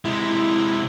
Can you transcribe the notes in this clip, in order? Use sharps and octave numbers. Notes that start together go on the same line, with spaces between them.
C3 G#3 E4